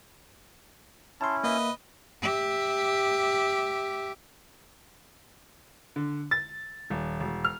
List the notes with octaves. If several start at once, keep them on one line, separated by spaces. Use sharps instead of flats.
C#4 E4 A5 C6
A#3 B4 D#5 E5
G4 E5
D3
A6
D#1
E1
F6